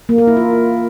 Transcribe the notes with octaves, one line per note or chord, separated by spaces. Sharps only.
A#3
A#4
E4
F4